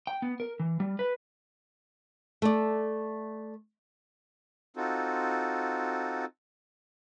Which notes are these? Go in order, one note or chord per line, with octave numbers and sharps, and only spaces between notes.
G5
B3
A#4
E3
G3
B4
A3 D5
C4 D#4 F4 F#4 A4